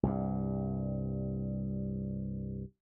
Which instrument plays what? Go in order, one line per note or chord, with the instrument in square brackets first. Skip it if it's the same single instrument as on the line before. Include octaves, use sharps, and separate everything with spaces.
[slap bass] C2 G2